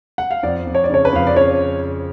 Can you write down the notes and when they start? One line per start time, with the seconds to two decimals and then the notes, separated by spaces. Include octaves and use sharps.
0.18 F#5
0.31 F5
0.43 F2 D5
0.67 F2
0.75 C#5
0.84 D5
0.90 C#3 C#5
1.05 B4
1.13 F2 F5
1.27 D5
1.36 C#3 C#5